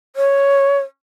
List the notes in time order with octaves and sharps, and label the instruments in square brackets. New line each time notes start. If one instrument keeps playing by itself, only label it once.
[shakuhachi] C#5